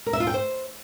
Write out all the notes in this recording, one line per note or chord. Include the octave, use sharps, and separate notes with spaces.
A#4
E5
F4
G5
C5